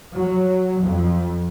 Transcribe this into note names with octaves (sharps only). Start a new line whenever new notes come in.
F#3
F2